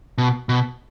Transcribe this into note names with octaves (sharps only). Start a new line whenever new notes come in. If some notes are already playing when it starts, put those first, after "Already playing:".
B2
B2